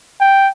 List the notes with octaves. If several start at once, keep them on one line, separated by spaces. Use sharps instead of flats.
G5